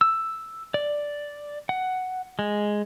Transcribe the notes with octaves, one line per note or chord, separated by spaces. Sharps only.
E6
D5
F#5
G#3